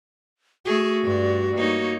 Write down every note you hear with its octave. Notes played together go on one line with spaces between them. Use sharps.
A3 F#4 G#4
G2 D5
A#3 D#4 C#5